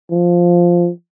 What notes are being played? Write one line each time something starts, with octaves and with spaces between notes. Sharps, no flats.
F3